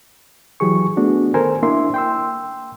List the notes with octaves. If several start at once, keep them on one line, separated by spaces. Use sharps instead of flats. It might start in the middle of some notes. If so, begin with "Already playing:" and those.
E3 F#3 G4 G#4 C#6
A3 B3 D4 F#4 G#4
D#3 A4 A#4 C5 G#5
A#3 D4 E4 E5 C6
G5 C6 E6